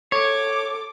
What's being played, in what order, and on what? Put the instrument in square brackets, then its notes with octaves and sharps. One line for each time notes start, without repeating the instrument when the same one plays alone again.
[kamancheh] A4 D6 [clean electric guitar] C#5